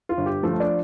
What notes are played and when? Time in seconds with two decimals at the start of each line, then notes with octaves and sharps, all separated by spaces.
0.09 F4
0.17 G1
0.26 G4
0.43 F3 A3 A4
0.60 D4 D5